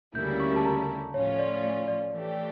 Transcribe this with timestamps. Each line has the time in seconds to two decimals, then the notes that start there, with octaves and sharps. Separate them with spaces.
0.15 D2 C#3 G3 A#3 E4 G6
0.40 C#6
0.56 A5
0.65 A#5
1.14 A2 F3 C#4 F4 C#5
1.39 D5
1.64 D5
1.88 D5
2.13 E3 A3 D4 G4